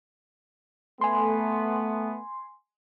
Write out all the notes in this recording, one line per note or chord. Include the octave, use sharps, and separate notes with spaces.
A3 B3 G#5 C6